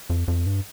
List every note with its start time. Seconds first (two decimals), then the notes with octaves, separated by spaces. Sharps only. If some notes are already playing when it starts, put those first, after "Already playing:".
0.10 F2
0.28 F2
0.46 G2